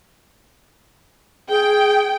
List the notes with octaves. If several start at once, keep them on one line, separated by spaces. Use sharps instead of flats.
G#4 G5